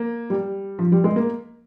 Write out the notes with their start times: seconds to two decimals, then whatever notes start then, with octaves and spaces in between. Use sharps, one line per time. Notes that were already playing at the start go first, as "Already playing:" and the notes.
Already playing: A#3
0.30 G3
0.79 F3
0.92 G3
1.04 G#3
1.16 A#3